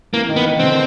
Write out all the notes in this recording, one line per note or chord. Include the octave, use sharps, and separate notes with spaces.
E3 A#3
D#3
B3
D#3
D3 C4